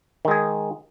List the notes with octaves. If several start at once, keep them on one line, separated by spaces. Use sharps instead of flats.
D#3 G#3 G#4